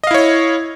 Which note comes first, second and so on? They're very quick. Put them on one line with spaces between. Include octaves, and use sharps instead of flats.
D#5 F5 E4 C#5